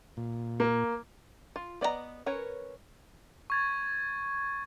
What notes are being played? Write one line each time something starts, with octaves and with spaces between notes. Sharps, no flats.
A#2
A#3
F4
B3 D5 D#5 F5 A#5
C#4 A#4 B4 C#5
C#6 G#6 A6